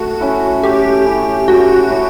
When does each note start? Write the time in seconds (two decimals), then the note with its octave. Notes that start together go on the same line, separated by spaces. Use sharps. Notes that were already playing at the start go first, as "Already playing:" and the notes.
Already playing: A3 F#4
0.21 C#4 E4
0.63 A3 G4
1.05 C#4 E4
1.48 A3 F#4
1.90 C#4 E4